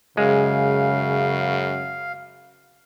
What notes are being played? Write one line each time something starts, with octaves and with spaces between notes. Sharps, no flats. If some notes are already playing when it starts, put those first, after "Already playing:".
F#2 C#3 G#3 F5